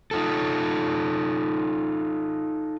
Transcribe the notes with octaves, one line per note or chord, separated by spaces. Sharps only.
D#4 F4 A4